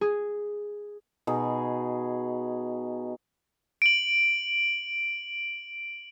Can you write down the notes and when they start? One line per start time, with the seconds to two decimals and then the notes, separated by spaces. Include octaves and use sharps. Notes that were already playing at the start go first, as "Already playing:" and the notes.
0.01 G#4
1.27 B2 D#4 G#4
3.82 D7 F#7